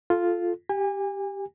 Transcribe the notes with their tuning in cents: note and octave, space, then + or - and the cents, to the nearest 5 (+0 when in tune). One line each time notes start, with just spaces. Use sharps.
F4 +0 A4 -15
G4 +0 G#5 -35